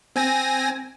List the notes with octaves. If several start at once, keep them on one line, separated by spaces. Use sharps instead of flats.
C4 G#5 A#6